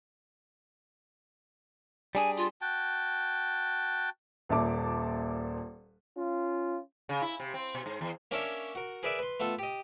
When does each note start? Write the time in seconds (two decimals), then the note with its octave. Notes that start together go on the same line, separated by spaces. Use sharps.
2.15 G3 D4 G#4 G#5
2.37 F4
2.61 F#4 G5 A5
4.49 D#1 A#2 E5 A5 D6
6.17 C#4 F4
7.09 C#3
7.22 E4
7.40 C3
7.54 C4
7.75 B2
7.86 G#2
8.01 E2
8.31 A#3 C#4 D4 A#4 C#5 E5
8.75 F#4 A#4
9.03 G#4 A#4 B4 D5 E5
9.19 B4 C6
9.40 A3 B3 F4 A4
9.59 G4 D#5